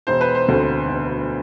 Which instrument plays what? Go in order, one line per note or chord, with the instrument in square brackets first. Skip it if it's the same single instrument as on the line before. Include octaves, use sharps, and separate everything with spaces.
[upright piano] E1 C5
B4
C5
D2 D3 A3 C4
E1